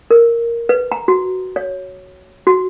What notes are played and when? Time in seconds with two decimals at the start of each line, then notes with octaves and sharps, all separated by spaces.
0.11 A#4
0.69 B4
0.92 A#5
1.08 F#4
1.56 C#5
2.47 F#4